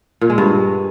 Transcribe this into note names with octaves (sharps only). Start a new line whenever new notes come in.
A#2
G#3
G2